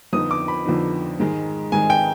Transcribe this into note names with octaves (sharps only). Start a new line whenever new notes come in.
F2 D3 F3 B3 D#4 D#6
D6
B5
F2 D3 F3 B3 D#4
G#2 D#3 G#3
G#2 D#3 G#3 G#5
G5